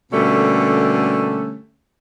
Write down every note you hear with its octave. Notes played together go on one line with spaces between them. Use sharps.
B2 D3 G3 A3 A#3 C#4